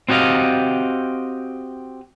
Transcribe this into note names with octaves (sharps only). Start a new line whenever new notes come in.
C4 F#4 G4 D#5 F5